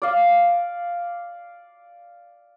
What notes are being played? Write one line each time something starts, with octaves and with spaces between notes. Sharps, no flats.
D5 F5